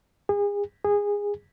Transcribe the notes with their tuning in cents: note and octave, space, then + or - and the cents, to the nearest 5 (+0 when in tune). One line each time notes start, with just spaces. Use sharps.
G#4 -35
G#4 -20